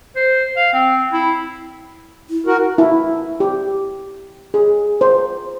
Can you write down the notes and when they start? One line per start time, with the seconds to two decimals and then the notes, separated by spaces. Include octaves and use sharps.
0.16 C5
0.57 F5
0.73 C4
1.13 E4
2.30 E4
2.47 F#4 A#4
2.78 E4
3.40 G4
4.54 G#4
5.01 C5